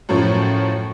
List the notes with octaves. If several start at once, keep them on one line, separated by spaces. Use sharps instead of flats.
F#2 A2 F3